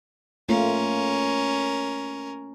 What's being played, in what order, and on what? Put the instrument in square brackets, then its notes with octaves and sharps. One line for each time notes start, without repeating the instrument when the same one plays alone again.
[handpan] A3 A#3 F4 [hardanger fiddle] C#4 A#4